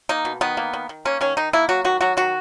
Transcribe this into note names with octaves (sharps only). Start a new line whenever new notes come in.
A#3 D#4
B2
D#3 B3
A#3
D#3
D#3
A#3 C#4
D#3 C#4
D#3 D#4
A#3 E4
F#3 F#4
D#3 F#4
F#3 F#4
D#3 F#4